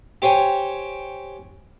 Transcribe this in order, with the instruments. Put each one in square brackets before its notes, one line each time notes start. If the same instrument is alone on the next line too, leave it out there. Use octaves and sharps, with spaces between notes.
[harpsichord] G4 C5 C#5 G5 G#5